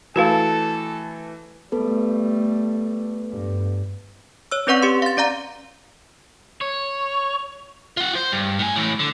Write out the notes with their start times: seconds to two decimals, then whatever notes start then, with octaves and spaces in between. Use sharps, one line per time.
0.16 E3 A3 F#4 A4 B4 F5
1.72 G3 A3 B3 A4 B4
3.31 G2
4.52 C#5 E6
4.67 C4 C#4 B4 D5 F#5 C#6
4.82 G4 C6
5.02 F5 A6
5.17 C#4 D5 F5 A#5
6.61 C#5
7.97 F4 F#5
8.15 C5
8.32 G2
8.59 A2 G#5
8.76 A2 E3
8.99 D3